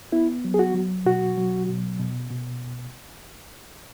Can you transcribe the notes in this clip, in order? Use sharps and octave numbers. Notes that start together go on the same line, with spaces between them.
B3 E4
F#3
G#4
F#4
F#3
B2 F#4
F#3
B2
B2
B2